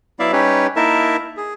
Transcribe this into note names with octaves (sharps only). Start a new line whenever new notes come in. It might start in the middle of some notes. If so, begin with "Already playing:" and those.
F#3 B3 E4 D5 E5 F5
G3 C#4 D#4 G4 B4 C#5
A#3 D#4 E4 A#4 E5 A5
G#4